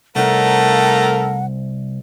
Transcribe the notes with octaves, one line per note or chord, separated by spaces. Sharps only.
C2 A3 D#4 A4 A#4 F#5